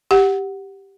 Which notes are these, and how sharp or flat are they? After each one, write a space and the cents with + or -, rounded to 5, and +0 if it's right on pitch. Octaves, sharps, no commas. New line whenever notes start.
G4 +0 F#5 +0